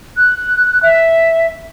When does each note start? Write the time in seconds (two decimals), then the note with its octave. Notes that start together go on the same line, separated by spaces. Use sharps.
0.17 F#6
0.83 E5